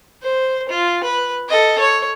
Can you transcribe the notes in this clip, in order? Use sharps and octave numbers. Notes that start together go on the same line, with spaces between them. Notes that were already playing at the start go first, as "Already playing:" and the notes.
C5
F4
B4
A4 D#5
C#5